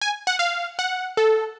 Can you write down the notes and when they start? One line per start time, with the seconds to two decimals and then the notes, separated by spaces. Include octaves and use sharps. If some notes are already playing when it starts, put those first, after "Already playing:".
0.01 G#5
0.27 F#5
0.39 F5
0.79 F#5
1.17 A4